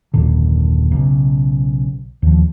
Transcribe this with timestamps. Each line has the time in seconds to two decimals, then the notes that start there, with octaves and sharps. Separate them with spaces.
0.14 F#1 D#2 A#2 D3
0.92 B1 C#3
2.22 D#2 F3